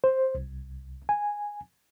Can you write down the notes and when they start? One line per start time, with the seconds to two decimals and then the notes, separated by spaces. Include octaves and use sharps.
0.04 C5
0.35 C2
1.09 G#5